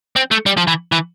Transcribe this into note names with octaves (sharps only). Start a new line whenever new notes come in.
C4
A3
G3
F3
E3
E3